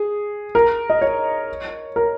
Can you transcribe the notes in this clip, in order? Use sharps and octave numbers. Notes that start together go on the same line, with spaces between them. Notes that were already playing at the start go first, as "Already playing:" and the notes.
Already playing: G#4
A#4
D#5
C#5
A#4